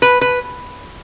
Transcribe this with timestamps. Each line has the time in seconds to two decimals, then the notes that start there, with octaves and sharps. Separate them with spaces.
0.02 B4
0.21 B4